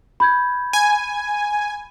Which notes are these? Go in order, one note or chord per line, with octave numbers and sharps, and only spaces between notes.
B5 G6 G#6
G#5